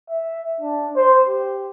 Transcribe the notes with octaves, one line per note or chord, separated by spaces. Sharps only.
E5
D4
C5
G4